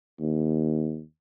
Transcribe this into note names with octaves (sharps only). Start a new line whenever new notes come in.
D#2